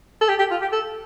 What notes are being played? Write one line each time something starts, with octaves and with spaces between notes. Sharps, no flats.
A4
G4
G4
F4
G4
A4